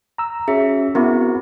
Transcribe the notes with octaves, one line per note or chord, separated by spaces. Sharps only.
A#5 E6
C#4 F#4 G#4 E5
B3 C4 E4 F#4 A#4